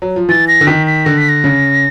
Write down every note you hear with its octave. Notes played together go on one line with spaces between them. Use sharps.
F#3
F3
E3 A6
A#6
D3
D#3 B6
B6
D3 A#6
B6
A#6
C#3